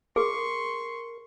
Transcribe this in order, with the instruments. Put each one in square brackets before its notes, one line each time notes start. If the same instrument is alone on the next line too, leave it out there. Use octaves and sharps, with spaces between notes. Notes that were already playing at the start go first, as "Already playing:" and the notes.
[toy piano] G#4 [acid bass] A#4 [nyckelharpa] C6 C#6